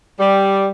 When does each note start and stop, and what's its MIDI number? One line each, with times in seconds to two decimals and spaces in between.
0.20 0.71 55